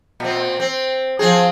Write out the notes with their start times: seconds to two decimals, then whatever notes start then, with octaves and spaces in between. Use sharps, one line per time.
0.20 A#2 C4
0.60 C4
1.19 F3 C4 G#4